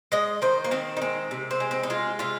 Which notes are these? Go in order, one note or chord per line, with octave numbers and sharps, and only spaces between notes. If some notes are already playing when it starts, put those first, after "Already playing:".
G#3 D#5
D#3 C5
A#3
D#3 C4
D#4
G#3 C4
C3
C4
G#3
C4
D#4
G#3 F4
C3 F4